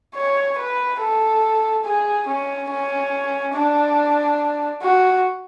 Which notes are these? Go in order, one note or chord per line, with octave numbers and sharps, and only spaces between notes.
C#5
B4
A4
G#4
C#4
C#4
D4
F#4